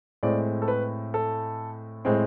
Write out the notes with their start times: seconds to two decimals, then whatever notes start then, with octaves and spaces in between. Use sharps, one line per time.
0.23 A2 G#3 C4 D5
0.62 A4
0.68 B4
1.14 A4
2.05 A2 G#3 C4